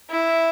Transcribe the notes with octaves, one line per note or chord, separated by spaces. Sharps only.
E4